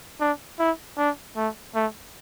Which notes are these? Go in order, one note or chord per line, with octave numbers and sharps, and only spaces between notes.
D4
E4
D4
A3
A3